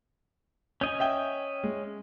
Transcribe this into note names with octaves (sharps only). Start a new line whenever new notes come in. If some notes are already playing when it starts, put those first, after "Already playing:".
C#4 D#5 G#5 G6
E5 G5 G7
G#3